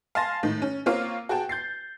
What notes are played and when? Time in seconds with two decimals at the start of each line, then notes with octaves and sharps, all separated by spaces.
0.15 F5 G#5 A5 C6 A6 A#6
0.43 A2 D#3
0.62 C#4
0.86 A#3 C4 F4 C#5 F5
1.29 F#4 G#4 G5 A5
1.49 G6 A6 C7